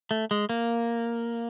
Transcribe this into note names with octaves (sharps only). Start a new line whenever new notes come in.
A3
G#3
A#3